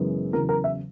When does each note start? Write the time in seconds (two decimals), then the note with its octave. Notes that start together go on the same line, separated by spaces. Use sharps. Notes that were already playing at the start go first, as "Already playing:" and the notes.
Already playing: F#2 C#3 E3 G#3 B3
0.33 E2 C#3 F#3 A#4
0.49 A#4
0.64 E5